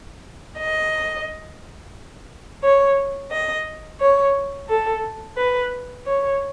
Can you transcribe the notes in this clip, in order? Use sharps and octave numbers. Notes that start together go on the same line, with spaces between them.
D#5
C#5
D#5
C#5
A4
B4
C#5